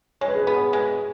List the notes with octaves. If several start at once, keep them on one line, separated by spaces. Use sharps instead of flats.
G#3 C#5
B4
G#4
B3 B4
G#3